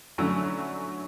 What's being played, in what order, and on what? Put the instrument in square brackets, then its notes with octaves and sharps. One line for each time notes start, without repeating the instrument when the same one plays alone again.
[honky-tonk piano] D3 F#3 A3 C#4 E4